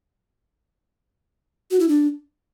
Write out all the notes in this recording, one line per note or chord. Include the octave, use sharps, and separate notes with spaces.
F#4
E4
D4